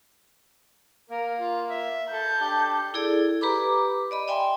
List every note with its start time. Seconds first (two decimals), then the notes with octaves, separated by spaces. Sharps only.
1.10 A#3 A#4
1.39 F4
1.70 E5
2.12 A4 G6
2.40 D4 G4
2.94 E4 G#4 A4 D5
3.41 G4 B4 A#5 B5 D6
4.11 D5 D#5 B5
4.28 D5 E5 G5 G#5 C6